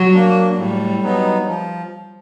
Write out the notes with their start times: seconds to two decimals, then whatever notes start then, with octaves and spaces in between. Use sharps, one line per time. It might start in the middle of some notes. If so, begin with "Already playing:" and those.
Already playing: F#3
0.14 A#3 D4
0.57 A2 G3
1.02 F#3 B3 D#4
1.47 F3